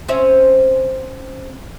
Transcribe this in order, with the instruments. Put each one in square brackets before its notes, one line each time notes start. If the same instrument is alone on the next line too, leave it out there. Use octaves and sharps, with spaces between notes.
[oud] C4 C#4 E5